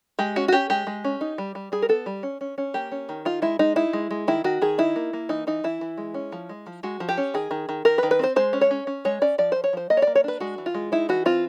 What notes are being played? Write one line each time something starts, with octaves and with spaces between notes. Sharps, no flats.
G#3 G4
C#4 F#4
F#4
C#4 G4
G#3 G4
G#3
C#4
D#4
G3
G3
G3 G#4
A#4
B3 A4
G3
C#4
C#4
C#4
A#3 G4
C#4
D#3
D#4 F4
G#3 E4
G#3 D#4
D#4 E4
G#3
G#3
D#3 E4
D#3 F#4
D#3 G#4
D#4 E4
A#3
A#3
E3 D#4
E3 D#4
E3 E4
E3
G#3
C#4
F3
G#3
F3
G#3 F#4
F3
G4
C#4
D#3 G#4
D#3
D#3
D#3 A#4
B4
D#3
B4
C4 C5
G#3 C5
C#4
C#5
C#4
C#4
G#3 C#5
C#4 D5
F3 D5
F3 C5
C#5
F3 C5
A#3 D#5
C#5
A#3 D5
C#5
D4 B4
G#3 F#4
E3
F4
G#3
D#4 E4
E3 F#4
C4 F4